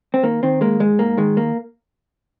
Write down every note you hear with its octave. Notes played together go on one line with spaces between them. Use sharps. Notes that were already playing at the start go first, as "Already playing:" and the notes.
C4
D#3 A#3
D#3 C4
G#3 A#3
G#2 G#3
G#2 A#3
D#3 G#3
A#3